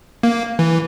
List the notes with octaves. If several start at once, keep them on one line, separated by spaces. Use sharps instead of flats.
A#3
E3